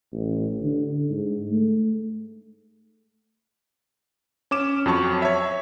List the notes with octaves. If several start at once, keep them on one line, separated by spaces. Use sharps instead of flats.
A1
D3
G#2
A3
C#4 D6 E7
F2 F#3 A5 C#6
C#5 E5